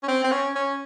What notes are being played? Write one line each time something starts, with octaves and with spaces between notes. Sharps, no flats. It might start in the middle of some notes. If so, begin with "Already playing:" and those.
C#4
C4
C4
C#4
C#4